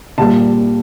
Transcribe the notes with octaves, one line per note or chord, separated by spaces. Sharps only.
A#2 G3 A5